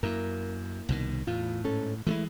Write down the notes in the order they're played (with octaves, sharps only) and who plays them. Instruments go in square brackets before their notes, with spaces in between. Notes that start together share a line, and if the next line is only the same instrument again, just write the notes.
[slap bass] F#2 [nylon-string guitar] A#3 E4 A#4
[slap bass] C2 B2 D#3
[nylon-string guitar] E2 F4 [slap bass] A2
[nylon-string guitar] G#2 C#4 A4
[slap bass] E3 F#3 G#3 [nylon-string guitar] A3 E4